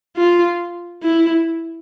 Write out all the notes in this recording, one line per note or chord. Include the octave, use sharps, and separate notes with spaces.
F4
E4